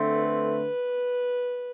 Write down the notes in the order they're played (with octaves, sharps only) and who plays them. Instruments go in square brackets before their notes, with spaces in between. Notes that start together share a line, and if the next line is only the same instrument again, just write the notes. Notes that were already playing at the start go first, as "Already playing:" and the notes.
Already playing: [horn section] D3 A3 C4
[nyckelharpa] B4